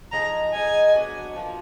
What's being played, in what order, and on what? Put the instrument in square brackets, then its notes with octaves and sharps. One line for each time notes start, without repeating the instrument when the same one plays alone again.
[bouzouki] F3 G#3 D#4 G#4 [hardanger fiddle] A#5
[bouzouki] G#3 D#4 G#4 [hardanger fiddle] G#5
[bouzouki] F#3 B3 D4 F#4
F3 A#3 F4